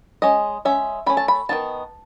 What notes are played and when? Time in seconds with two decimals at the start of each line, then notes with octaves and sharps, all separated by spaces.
0.22 G#3 C#4 D#5
0.65 G#3 C#4 E5
1.06 D#3 A3 C#4 B5
1.17 A5
1.28 B5
1.49 D#3 F#3 B3 D#4 A5